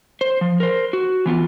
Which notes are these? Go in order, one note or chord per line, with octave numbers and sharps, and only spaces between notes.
C5
F3
A#4 C5
F#4
E3 B3 F4